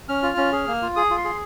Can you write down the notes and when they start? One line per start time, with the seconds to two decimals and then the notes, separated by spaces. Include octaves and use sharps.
0.09 C#4 F6
0.23 F4
0.37 C#4
0.53 G#4
0.68 A#3
0.82 F4
0.96 G#4 D#6
1.11 F4
1.17 C6
1.25 G#4